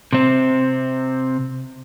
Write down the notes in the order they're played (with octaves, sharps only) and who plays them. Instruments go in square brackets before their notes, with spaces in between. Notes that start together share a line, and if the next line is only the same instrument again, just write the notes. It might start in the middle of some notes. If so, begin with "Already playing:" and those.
[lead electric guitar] C3 C4